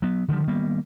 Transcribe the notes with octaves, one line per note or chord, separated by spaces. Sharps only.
F#3 B3
D3 D#3 F3 G3
D#3 G3 A#3 B3